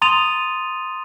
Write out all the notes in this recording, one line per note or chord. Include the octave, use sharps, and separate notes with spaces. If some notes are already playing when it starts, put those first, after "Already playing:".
A#5 C6 D#6 A6 D#7 F7